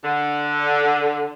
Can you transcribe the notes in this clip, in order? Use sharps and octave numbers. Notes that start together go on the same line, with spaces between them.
D3